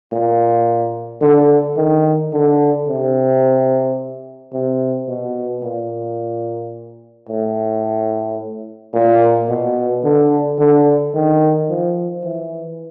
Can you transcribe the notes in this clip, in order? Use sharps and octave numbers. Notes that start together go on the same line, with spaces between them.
A#2
D3
D#3
D3
C3
C3
B2
A#2
A2
A#2
B2
D3
D3
D#3
F3
E3